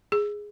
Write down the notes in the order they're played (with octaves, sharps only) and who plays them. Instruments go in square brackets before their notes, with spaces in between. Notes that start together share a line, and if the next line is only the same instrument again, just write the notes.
[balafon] G#4